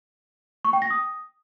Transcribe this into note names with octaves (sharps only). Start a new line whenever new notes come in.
C#6
G5
A#6
D#6